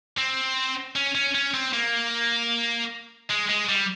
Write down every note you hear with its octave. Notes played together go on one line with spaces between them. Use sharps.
C4
C#4
C#4
C#4
C4
A#3
G#3
G#3
G3